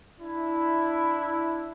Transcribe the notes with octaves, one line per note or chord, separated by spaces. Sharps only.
D4 E4